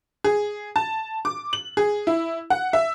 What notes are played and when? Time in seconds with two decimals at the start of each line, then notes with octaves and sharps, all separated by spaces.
0.24 G#4
0.76 A5
1.25 D6
1.53 F#7
1.77 G#4
2.07 E4
2.50 F#5
2.73 E5